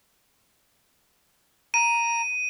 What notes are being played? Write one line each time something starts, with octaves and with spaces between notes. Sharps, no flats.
A#5 D#7